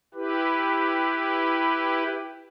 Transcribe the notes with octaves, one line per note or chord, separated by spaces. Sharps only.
E4 G4 B4